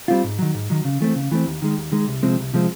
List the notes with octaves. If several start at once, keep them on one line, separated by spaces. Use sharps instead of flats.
G3 C4 F4
G#2
D#3 F#3
G#2
D#3 F#3
C#3
E3 A3 C4
C#3
E3 A3 C4
D#2
D#3 G#3
D#2
D#3 G#3
C2
C3 F3 G#3 C4
C2
C3 F3 G#3 C4